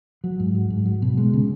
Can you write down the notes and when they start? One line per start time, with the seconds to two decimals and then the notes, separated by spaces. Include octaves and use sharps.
0.24 F#3
0.40 G#2
0.54 F#3
0.70 G#2
0.86 F#3
1.02 B2
1.17 G#3
1.33 C#3